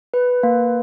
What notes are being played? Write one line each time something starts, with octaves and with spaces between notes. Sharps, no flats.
B4
A#3